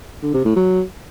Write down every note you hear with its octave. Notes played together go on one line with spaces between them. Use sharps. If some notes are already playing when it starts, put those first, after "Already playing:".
D3
C3
A2
F#3